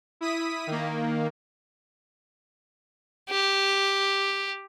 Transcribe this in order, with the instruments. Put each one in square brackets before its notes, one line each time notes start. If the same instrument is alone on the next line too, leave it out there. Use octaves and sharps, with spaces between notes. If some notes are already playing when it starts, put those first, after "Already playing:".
[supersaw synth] E4 D#6 B6 D#7
D#3 A#3
[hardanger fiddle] G4